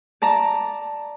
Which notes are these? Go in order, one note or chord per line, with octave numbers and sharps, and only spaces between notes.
D5 A5 A#5